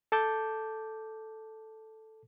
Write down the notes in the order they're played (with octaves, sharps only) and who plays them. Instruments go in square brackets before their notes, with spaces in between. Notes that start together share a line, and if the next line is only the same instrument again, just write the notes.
[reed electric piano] A4 A5 D6 G6